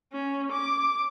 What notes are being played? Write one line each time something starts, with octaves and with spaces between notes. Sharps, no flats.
C#4
D6